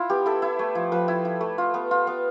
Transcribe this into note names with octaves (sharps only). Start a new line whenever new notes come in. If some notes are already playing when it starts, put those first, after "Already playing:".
Already playing: E4 F4
B3 G4
E4 A4
E4
A3
F3
F3 B4
E4
E4
A3
F4
B3
F4
B3